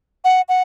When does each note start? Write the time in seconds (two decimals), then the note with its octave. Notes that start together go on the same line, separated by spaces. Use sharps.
0.24 F#5
0.49 F#5